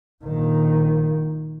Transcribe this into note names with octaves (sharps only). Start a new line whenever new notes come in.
A#1 D#3